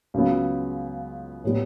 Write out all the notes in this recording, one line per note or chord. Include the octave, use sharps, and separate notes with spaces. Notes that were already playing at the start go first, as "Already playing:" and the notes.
C#2 C#3 F#3 B3
A2 G3 B3